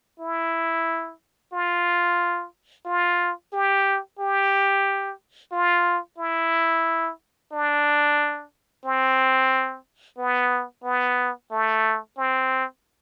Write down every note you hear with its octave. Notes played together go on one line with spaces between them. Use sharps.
E4
F4
F4
G4
G4
F4
E4
D4
C4
B3
B3
A3
C4